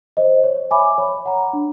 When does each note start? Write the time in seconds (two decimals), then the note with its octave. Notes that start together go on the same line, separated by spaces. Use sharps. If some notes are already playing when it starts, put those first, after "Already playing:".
0.17 C5 D#5
0.44 C#5
0.71 E5 G#5 B5 D6
0.98 C#5
1.26 F#5 A#5
1.53 D4